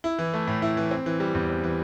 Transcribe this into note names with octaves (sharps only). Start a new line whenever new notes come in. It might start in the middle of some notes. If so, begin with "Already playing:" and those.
E4
E3
A3
A2
E4
E3
C4
E3
G3
E2
C4
E3